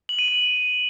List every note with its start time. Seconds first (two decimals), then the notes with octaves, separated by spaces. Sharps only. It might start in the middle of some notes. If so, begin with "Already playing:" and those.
0.09 F#7
0.19 D#7
0.28 F#7